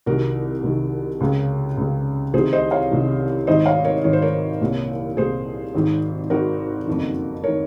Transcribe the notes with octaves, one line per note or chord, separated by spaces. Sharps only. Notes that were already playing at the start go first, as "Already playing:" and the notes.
C2 C3 D#3 F#4 A#4
C2 C3 D#3
C#2 C#3
C#2 C#3
C2 C3 D#3 G#4 C5
C5 D#5
C#5 F5
C2 C3 D#3
G#1 G#2 D#3 C5 D#5
C#5 F5
A#4 C#5
G#1 G#2 D#3 C#5
C5
A#4 C#5
C2 A#2
C2 A#2 G#4 C5
G#1 G#2 D#3
G#1 G#2 D#3 F#4 A#4
F#1 F2 D#3
D#3 A#4 C#5